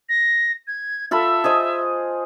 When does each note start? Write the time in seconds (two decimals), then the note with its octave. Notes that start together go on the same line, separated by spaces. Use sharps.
0.09 A#6
0.67 G#6
1.11 F4 A4 E5 B5
1.44 G#4 C5 D#5